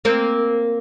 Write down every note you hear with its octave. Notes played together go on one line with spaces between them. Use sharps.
A#3 C4